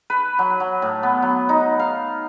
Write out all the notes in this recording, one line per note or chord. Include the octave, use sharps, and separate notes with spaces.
B4
F#3
F#3
A2
B3
F#3
D#4
F5